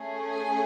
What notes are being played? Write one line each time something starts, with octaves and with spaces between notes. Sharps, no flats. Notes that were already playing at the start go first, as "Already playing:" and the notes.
Already playing: A3 C#4 G#4
G#5